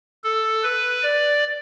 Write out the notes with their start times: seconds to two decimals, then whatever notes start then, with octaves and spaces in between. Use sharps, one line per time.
0.24 A4
0.63 B4
1.03 D5